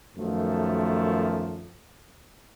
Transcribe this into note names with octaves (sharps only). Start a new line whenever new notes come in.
B1 F#2 D#3 F3 A3